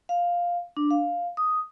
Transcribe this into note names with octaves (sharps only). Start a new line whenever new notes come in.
F5
D4
F5
D#6